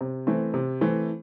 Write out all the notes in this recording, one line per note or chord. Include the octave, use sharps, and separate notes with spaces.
C3
E3 A3 C4
C3
E3 A3 C4